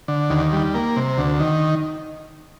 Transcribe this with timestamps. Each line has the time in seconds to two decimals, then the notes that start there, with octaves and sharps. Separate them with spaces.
0.08 D3
0.30 D#2
0.53 G3
0.75 A#3
0.96 C3
1.18 D2
1.40 D#3